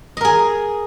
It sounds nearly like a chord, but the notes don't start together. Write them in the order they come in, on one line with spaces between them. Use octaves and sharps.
D#5 A#4 G#4